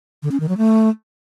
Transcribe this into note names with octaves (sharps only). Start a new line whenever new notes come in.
D3
C#4
D#3
F#3
A3